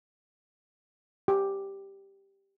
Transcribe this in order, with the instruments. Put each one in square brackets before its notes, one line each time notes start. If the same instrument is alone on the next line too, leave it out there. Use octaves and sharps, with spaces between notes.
[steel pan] G4